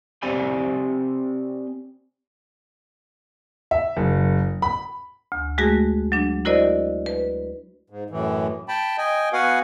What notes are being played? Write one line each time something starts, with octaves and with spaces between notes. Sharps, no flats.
C4 G4 C5 D5 G#5 B5
E5
F#1
B5
D2
G#3 A3 F#4 G#4 F#6 A#6
F#3 D4
E4 F#4 A#4 C5 D5 D#5
B4
G#2
F#2 A2 E3
G5 A5 B5
D#5 G5 G#5
B3 F#4 B4 F5 F#5 G#5